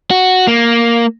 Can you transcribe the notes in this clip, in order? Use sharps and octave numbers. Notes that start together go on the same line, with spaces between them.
F#4
A#3